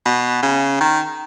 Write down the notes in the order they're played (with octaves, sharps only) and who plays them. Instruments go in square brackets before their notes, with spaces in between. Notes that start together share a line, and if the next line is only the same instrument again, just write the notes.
[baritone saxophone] B2
C#3
D#3